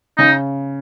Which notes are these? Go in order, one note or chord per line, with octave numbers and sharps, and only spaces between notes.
C#3 D#4